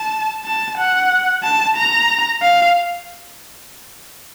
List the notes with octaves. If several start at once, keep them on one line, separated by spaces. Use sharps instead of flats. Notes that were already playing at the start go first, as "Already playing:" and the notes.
Already playing: A5
A5
F#5
A5
A#5
F5